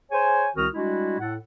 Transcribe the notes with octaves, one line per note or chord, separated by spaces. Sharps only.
G#4 C5 C#5 G#5
C2 D#3 C4 F#4 D#6 F6
G3 G#3 D4 E4 F#4
A2 A4 F#5